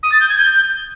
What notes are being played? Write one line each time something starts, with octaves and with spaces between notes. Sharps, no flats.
D#6
A6
G6
G#6
G6